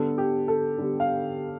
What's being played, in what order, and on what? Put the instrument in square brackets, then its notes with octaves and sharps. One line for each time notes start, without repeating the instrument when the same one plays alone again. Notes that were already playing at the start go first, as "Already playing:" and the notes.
Already playing: [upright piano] D3 G3 B3 A4
G4
A4
D3 G3 B3
F5